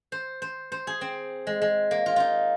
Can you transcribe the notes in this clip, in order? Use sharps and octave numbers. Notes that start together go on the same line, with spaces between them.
C5
C5
C5
G#4
C4
G#3
G#3
A#3
F4
D#4 F4